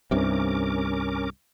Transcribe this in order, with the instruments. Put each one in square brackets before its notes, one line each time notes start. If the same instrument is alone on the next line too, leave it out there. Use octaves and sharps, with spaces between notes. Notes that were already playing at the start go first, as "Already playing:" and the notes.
[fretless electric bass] C2 G2 C3 [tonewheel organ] C#4 A#4 D6